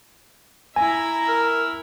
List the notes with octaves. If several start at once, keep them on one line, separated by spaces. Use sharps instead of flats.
E4 E5 G#5 A#5
A#4